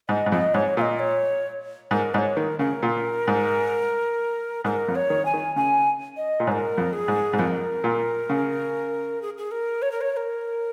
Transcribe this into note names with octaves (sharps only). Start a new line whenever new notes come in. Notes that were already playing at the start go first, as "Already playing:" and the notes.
G#2 D#5
G#2
F2 D#5
G#2 C#5
A#2 D#5 F5
C#5
G#2 A#4
G#2 D#5
C#5
D#3 A#4
C#3 A#4
A#2
G#2
G#2 A#4
F2
C#5
D#3
G#5
D#3
C#3 G#5
D#5
A#2
G#2 C#5
A#4
F2
G#4
G#2
G#2
F2 A#4
A#2
C#3
G#4
G#4
A#4
C#5
A#4
C#5
C#5
A#4